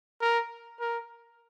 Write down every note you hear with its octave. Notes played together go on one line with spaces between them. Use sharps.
A#4
A#4